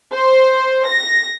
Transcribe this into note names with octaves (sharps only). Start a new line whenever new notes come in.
C5
A#6